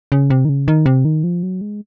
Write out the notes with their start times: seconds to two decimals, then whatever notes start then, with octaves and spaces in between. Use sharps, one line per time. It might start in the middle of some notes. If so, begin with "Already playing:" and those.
0.12 C#3
0.30 C3
0.45 D#3
0.49 C#3
0.68 D#3
0.86 C3
1.05 D#3
1.24 F3
1.43 F#3
1.61 G#3